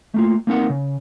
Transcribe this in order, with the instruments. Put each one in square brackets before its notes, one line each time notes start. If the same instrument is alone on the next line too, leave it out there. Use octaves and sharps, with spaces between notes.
[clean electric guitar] A3 A#3 F4
A#3 C4 D#4 A#4 F#5
C#3